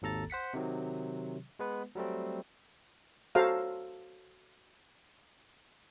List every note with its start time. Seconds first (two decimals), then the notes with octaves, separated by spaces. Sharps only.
0.02 G#1 D#2 A4 A#5 A6
0.30 C5 F#5 B6 C#7
0.54 C3 D#3 F#3
1.59 G#3 B3 B4
1.95 F#3 G3 A3 C4
3.35 F#4 A4 C5 C#5 F5 A#5